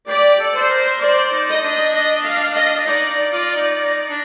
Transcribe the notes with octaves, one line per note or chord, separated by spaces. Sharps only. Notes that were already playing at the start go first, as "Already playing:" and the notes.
G4 D5
A4
C5
A#4
C5 D5
D#4
D#5
D4
D#5
F5
D#5
D#4 D5
D#4
F4
D#4
D#4
D4